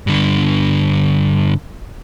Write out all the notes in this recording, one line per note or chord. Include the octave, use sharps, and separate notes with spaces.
G2 D3